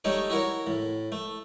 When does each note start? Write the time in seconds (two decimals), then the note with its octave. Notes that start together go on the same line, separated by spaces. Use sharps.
0.04 G3 A3 D#4 C#5
0.30 E4 F#4 A#4 C#5
0.67 A2
1.12 A3